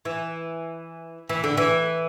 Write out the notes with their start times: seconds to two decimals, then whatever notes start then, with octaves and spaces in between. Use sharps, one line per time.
0.05 E3
1.29 E3
1.44 D3
1.57 E3